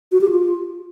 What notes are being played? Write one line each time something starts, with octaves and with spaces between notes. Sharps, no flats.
F#4
G4
F4